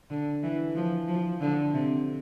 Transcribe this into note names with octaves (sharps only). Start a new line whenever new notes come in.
D3
E3
F3
F3
D3
C3